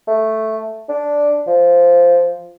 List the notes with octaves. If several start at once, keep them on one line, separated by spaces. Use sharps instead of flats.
A3
D4
F3